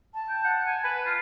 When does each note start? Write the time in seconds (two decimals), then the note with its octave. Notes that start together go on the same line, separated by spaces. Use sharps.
0.14 A5
0.29 G5
0.45 F#5
0.67 G#5
0.84 B4
1.06 F4